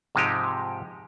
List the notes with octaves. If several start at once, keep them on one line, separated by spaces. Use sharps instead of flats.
G#2 C3 F3 G#3 D#4 G4